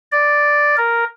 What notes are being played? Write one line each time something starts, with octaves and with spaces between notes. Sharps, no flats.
D5
A#4